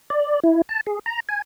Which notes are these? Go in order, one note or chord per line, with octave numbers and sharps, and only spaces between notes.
D5
E4
A5
G#4
A#5
G#5